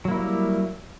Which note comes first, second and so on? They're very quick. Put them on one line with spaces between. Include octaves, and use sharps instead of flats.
F#3 A#3 E4 G3